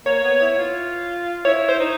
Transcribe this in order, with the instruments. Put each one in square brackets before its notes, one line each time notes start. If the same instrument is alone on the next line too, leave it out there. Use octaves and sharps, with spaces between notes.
[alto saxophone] A#3 [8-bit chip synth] C#5
[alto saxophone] B3
E4
F4
[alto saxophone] E4 [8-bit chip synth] C#5
[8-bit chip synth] C5
[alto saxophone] D#4